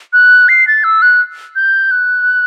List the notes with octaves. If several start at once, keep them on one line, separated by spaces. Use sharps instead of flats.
F#6
C7
A6
E6
F#6
G6
F#6